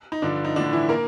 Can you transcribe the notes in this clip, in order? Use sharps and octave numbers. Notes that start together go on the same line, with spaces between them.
D#4
G2 D3 F3 D4
D#4
A2 D3 F3 D4
E3 E4
A#3 A#4